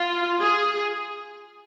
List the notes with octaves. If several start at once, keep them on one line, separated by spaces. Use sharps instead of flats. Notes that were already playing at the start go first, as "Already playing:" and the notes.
Already playing: F4
G#4